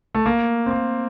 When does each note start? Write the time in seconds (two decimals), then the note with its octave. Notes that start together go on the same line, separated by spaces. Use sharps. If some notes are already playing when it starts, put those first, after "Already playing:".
0.15 A3
0.26 A#3
0.66 C4
0.71 A#3